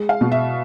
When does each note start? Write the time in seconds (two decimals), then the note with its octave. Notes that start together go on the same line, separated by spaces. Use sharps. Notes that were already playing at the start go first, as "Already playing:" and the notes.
Already playing: G#3
0.09 F5
0.21 B2
0.32 E5